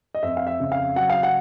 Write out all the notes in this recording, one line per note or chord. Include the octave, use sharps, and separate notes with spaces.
D#5
F2 E5
F5
E5
C#3
F5
F#3 F#5
F5
F#5